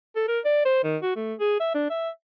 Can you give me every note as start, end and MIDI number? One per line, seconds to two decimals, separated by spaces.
0.16 0.26 69
0.28 0.39 70
0.45 0.61 74
0.65 0.83 72
0.84 0.97 51
1.03 1.13 66
1.16 1.34 57
1.39 1.57 68
1.60 1.70 76
1.75 1.87 62
1.90 2.09 76